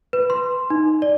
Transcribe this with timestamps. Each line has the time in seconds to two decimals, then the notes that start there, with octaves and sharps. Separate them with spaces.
0.13 B4
0.30 C6
0.70 D#4
1.02 D5